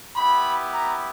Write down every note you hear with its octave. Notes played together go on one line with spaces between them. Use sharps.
B3 E4 G4 B5
A#5